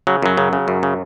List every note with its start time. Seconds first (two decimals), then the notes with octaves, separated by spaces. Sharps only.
0.07 C#3 F#3
0.22 F#2 F#3
0.37 C#3
0.53 C#3
0.68 F#2
0.83 C#3